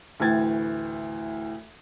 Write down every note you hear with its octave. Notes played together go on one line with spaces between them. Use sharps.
D2 A2 E3 G5 G#6 A6